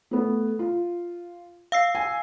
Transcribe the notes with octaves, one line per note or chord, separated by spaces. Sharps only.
A3 B3
F4
F5 E6 C7
G#5